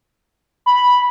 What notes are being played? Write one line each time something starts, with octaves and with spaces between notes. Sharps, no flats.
B5